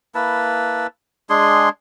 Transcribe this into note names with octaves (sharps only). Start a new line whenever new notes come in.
A#3 E4 B4 A5
G#3 D4 G#4 C6